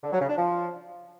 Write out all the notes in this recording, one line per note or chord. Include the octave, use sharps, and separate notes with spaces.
D3
F#3
C#3
D4
F3